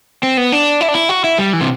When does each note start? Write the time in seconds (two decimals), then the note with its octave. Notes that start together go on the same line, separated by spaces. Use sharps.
0.23 C4
0.37 B3
0.52 D4
0.81 E4
0.88 D4
0.95 E4
1.09 F#4
1.24 E4
1.38 G3
1.53 E3
1.61 C3